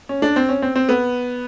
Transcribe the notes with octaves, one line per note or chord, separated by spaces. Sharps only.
C#4
D4
C4
C#4
C4
C4
B3